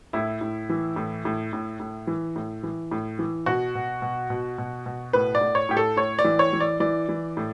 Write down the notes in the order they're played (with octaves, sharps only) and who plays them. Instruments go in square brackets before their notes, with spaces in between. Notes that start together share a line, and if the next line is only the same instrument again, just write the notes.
[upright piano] A2 E4
A2
E3
A2
A2
A2
A2
E3
A2
E3
A2
E3
B2 F#4
B2
B2
B2
B2
B2
A2 B4
D5
A2
C#5
A2 G4
A4
A2 C#5
D5
E3
C#5
E3
D5
E3 D5
E3
A2